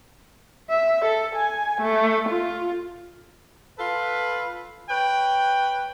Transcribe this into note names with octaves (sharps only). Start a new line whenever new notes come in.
E5
A4
G#5
A3
F4
F4 A4 B4
B4 C#5 G5